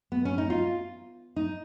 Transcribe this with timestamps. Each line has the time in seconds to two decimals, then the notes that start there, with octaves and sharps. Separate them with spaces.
0.12 B3
0.25 C#4
0.38 D#4
0.50 F4
1.36 D#4